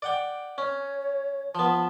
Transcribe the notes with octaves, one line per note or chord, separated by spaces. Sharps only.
D5 F#5 G5
C#4 C#5
F3 B3 A5